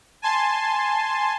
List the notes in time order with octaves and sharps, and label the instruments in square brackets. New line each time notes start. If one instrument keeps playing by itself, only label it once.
[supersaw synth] G#5 A5 C6